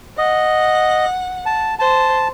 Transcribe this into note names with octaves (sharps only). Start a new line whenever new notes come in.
D#5 F#5
A5
C5 A5